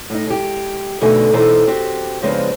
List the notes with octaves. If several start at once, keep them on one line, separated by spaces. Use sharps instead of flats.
A2 D#4
G#3 G4
F2 B2 D3 A3 D#4 G#5
B2 E3 D#4 A4 C5 A#5
C4 F#4 G4
C#3 F3 G#3 B3 C4 D4